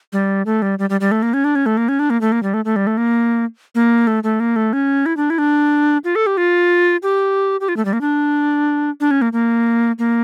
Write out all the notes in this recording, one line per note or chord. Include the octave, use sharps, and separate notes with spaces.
G3
A3
G3
G3
G3
G3
A3
A#3
C#4
D4
C#4
A3
A#3
C#4
D4
A#3
A3
A#3
G3
A3
A3
G3
A3
A#3
A#3
A3
A3
A#3
A3
C#4
E4
D4
E4
D4
F4
A4
G4
F4
G4
G4
F4
A3
G3
A#3
D4
D4
C#4
A#3
A#3
A#3